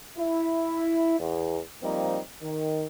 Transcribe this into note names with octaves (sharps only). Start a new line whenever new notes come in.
E4
E2
F3 G3 A#3 C4 D#4
D#3